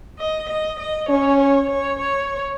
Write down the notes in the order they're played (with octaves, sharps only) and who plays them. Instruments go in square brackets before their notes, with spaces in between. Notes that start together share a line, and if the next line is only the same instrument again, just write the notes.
[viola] D#5
D#5
D#5
[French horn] C#4 [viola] C#5
[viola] C#5
C#5
C#5